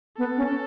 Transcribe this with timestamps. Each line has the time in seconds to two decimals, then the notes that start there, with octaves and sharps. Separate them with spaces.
0.18 B3 A4
0.37 C#4